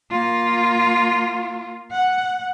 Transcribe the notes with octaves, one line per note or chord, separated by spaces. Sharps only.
A#3 F4
F#5